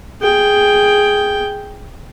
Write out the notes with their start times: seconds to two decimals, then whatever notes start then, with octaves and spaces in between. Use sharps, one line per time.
0.21 G#4 G5